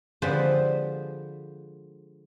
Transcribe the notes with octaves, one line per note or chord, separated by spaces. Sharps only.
D3 F3 G#3 G4 B4 C5